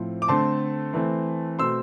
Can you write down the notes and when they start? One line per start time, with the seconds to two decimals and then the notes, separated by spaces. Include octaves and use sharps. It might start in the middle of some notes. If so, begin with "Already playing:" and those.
Already playing: A2 F3 C4
0.22 D6
0.28 D3 A3 C4 A5 C6
0.94 E3 A3 C4
1.59 B2 A3 C4 C6 E6